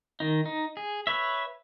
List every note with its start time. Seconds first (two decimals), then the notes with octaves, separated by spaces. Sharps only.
0.20 D#3 D#4
0.46 D#4
0.77 G#4
1.07 B4 C#5 E5